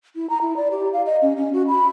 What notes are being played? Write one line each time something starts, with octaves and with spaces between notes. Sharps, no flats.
E4
A#5
E4
D5
G4
F5
D#5
C#4
C#4
F#4
B5